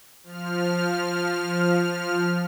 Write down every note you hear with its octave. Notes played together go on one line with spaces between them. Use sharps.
F3 F6